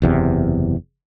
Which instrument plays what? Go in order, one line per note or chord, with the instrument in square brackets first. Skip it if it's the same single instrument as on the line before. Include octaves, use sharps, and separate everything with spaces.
[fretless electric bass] F#1 E2 C3